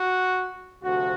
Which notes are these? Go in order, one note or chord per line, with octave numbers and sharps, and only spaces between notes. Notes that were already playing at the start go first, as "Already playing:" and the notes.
Already playing: F#4
D2 C3 F3 F#4